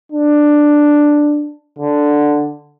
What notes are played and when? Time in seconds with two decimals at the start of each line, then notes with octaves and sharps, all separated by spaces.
0.12 D4
1.79 D3